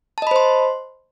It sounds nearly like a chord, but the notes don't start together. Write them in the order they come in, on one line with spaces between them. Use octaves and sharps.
A5 D#5 B5 C5 C6